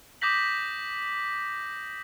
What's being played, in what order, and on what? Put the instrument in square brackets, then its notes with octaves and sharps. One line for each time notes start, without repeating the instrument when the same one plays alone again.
[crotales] D6 D#6 G6 A#6 B6 F#7